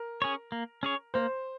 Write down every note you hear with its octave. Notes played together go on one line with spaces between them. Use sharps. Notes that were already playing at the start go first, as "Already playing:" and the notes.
Already playing: A#4
C#4 G#4 C#5
A#3
C#4 G#4 C#5
A#3 C5